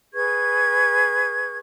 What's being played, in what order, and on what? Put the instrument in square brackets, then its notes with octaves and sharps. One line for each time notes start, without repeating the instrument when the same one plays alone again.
[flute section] G#4 B4 C#6 G#6